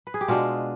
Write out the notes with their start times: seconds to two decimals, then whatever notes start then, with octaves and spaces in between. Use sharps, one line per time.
0.07 B4
0.14 G#4
0.21 G4
0.28 B2 G#3 D4 F4